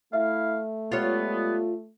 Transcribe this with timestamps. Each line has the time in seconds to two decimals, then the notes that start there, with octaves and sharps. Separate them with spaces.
0.13 A3 E4 E5 F5
0.92 G3 G#3 B3 F4 C#5